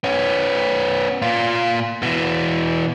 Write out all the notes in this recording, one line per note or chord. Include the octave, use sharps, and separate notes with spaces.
B3 C#4
A#2 F4
B2 E3